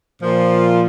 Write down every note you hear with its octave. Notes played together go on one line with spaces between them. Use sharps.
A#2 F3